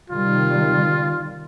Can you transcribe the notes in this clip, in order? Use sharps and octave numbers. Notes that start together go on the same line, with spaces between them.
C3 D#3 G3 F4